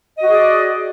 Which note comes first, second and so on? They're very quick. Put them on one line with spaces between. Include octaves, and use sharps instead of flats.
D#5 F#4 G#4 D5